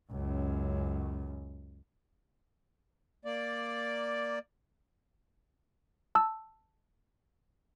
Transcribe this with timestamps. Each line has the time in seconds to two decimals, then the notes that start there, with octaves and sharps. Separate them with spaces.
0.11 C#2 F#2
3.25 A#3 D5
6.15 A5 E6